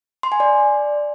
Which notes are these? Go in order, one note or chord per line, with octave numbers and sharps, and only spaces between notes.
C6
G#5
D5